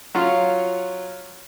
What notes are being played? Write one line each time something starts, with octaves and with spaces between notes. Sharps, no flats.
F#3 C#4 F4